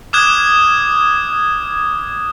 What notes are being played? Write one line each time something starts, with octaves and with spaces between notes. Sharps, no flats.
D6 D#6 F6 F#6 G#6 E7